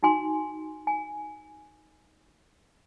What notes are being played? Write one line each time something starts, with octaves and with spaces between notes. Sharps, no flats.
D#4 F#4 G#5 C6
G#5